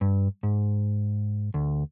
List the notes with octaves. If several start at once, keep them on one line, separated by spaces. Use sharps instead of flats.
G2
G#2
D2